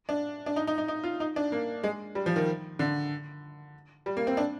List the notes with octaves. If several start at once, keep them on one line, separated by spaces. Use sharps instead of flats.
D4
D4
D#4
D#4
D#4
D#4
F4
D#4
D4
A#3
G#3
G3
F3
D#3
D3
G3
A#3
C4
D4